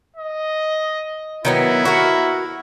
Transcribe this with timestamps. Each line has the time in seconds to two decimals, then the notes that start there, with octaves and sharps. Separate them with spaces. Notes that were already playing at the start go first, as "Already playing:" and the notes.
0.16 D#5
1.45 D#3 F#3 B3 E4
1.85 F#4 A#4